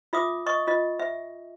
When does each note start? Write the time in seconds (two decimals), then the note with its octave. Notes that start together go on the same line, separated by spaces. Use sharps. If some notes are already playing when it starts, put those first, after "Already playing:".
0.13 F4 E5 D6 D#6
0.46 D#5 C#6 D#6
0.67 F4 D#5
0.99 E5